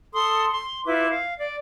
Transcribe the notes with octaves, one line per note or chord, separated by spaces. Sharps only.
A4 C6 D#6
C6
E4 F4 B4 D6
F5
D5